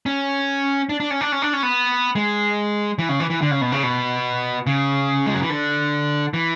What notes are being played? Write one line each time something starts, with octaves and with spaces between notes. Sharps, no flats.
C#4
D4
D4
C#4
D4
C#4
D4
C#4
B3
G#3
E3
C#3
E3
E3
D3
C#3
B2
C#3
B2
C#3
G#3
F#3
E3
D3
E3